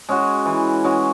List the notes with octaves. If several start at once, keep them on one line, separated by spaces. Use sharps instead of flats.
G#3 C#4 F#4
E3
G#3 C#4 F#4